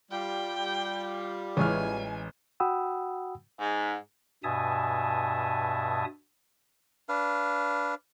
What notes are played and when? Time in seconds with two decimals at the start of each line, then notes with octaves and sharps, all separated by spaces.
0.11 G3 F4 G5
1.57 A1 E3 G#3 C#5 G#5 F6
2.60 F#4 F#5 G5 B5 D#6 E6
3.59 G#2
4.44 G2 B2 E5 G#5 A5 D#6
7.09 D4 B4 F5